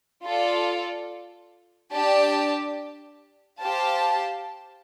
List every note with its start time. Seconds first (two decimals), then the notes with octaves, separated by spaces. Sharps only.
0.24 F4 A4 D5
1.92 D4 G4 D5 A5
3.60 G4 C5 F5 A5